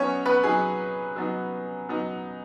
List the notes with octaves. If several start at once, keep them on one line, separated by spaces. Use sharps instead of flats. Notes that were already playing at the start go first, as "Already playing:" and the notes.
Already playing: F#3 B3 C#4 D#4 C#5
B3 B4
F#3 B3 D#4 G#4
F#3 B3 D#4
F#3 B3 D#4